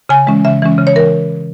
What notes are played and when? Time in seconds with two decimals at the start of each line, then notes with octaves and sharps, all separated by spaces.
0.09 C#3 G#5
0.27 E3 G#3 C#4
0.45 C#3 E5
0.62 E3 G#3 C#4
0.78 C#3
0.87 C#5
0.96 E3 A#4